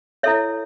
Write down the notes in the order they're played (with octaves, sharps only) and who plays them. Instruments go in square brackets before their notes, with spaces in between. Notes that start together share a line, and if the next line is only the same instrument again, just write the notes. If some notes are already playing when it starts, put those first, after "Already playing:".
[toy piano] E4 A4 C#5 E5